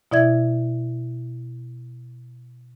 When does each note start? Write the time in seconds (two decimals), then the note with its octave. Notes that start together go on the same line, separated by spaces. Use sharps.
0.11 B2 E4 D5 E5 G#6